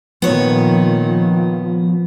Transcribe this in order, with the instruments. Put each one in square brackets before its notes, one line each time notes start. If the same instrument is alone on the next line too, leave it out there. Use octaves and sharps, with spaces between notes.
[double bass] A#2 D#3 [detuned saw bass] F3 [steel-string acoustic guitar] B3 C#5